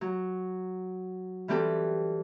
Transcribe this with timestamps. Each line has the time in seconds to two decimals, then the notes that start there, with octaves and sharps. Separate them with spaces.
0.01 F#3
1.48 E3 G3 C4 G4 A4